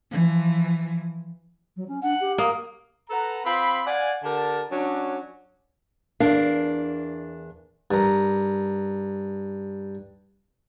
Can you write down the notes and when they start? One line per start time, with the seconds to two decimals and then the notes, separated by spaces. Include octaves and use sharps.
0.12 E3 F3
1.76 F#3
1.88 C#4
2.03 D4 F#5
2.21 G4
2.38 A#3 D#6
3.09 A4 B4 F#5 A#5
3.44 C4 F4 B5
3.85 D5 F5 F#5 G#5
4.23 D3 G4 A#4 A5
4.70 F#3 C#4 D4
6.20 E2 D4 A#4 F5
7.91 G2 A#4